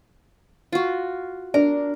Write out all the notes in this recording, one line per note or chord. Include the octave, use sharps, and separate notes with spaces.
F4 F#4
D4 A#4